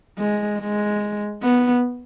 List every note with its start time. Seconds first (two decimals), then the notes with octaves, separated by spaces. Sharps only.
0.18 G#3
0.59 G#3
1.42 B3